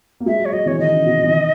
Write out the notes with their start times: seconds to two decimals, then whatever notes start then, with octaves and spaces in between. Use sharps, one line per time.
0.20 A#3
0.26 G#3 E5
0.39 F#3
0.45 C#5
0.52 F#3 D#5
0.66 E3 C#5
0.79 D#3 D#5
0.92 C#3
1.05 B2
1.23 E3
1.31 D#3